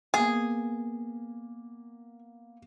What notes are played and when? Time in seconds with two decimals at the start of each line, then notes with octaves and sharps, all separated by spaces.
0.14 A#3 B3 G#4